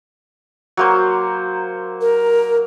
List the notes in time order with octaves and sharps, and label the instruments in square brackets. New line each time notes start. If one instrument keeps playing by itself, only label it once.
[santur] F#3 A#3 C5
[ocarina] A#4